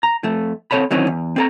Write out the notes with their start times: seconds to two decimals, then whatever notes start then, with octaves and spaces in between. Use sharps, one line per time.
0.03 A#5
0.24 F2 A3
0.71 C4 A4 C#5 A5 B5
0.91 D#3 E3 F#3 C4 C#4
1.07 E2
1.36 C4 A4 A#5